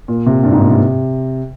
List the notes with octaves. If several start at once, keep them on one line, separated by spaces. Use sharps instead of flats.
A#2
C3
G2
G#2
A#2
C3